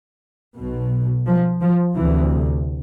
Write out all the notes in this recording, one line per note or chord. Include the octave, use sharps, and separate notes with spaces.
B1 B2
F3
F3
D2 C3 E3